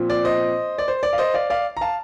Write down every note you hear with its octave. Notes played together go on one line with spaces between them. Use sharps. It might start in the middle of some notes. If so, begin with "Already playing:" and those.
Already playing: A#2 F3 C4
D5
C5 D#5
D5
C5
D5
F5
C5 D#5
D5 F5
D5 F5
A#5
F5 A5